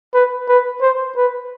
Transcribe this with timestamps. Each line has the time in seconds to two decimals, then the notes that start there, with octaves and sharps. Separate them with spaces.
0.14 B4
0.49 B4
0.82 C5
1.17 B4